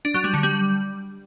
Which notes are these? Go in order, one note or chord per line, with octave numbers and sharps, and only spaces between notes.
D4
F#3
G3
D3
G3